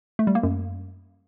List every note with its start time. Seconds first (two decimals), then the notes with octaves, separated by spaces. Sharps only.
0.19 A3
0.27 G3
0.35 A#3
0.43 F#2